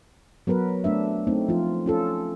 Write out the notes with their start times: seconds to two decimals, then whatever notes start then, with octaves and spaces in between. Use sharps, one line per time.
0.47 F#3 B3 A#4 B4
0.84 A3 D4 E5
1.27 A3 C4 D#4
1.49 F3 F4
1.86 C#4 F4 A4